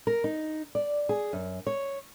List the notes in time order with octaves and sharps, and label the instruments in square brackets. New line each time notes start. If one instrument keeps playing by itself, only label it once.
[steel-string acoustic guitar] A#4
D#4
D5
G#4
F#2
C#5